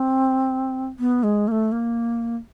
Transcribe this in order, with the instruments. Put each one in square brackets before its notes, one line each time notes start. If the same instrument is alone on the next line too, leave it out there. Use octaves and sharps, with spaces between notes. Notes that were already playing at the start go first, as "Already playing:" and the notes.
Already playing: [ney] C4
B3
G#3
A#3
A3
A#3